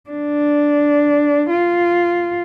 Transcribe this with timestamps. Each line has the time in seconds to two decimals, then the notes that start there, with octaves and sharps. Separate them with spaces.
0.11 D4
1.50 F4